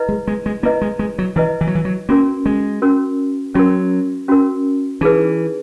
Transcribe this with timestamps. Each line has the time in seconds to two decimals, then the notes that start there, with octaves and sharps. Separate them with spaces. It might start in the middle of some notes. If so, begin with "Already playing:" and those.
Already playing: E4 B4 D#5
0.09 G#3
0.27 G#3
0.46 G#3
0.63 A#3 E4 B4 D#5
0.81 G#3
0.99 G#3
1.19 F#3
1.36 E3 E4 B4 D#5
1.61 E3
1.67 F#3
1.75 E3
1.85 F#3
2.09 A#3 C#4 F#4 A#4
2.46 G#3
2.82 C#4 F#4 A#4
3.55 F#3 C#4 F#4 A#4
4.28 C#4 F#4 A#4
5.01 E3 D#4 G#4 B4